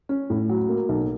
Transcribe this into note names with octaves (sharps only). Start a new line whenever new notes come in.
C#4
A2
F#3
A#3
B1